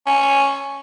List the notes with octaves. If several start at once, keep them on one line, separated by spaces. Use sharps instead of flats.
C#4